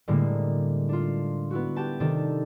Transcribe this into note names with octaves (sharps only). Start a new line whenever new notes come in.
A2 D3 G3 G#3 A#3
D4 F4
B3 E4 F#4
G4 G5 A5
C3 D#3 D4 A4